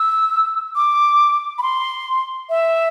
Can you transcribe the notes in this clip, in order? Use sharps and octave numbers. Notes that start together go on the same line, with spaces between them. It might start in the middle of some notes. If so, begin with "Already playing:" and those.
Already playing: E6
D6
B5
C6
E5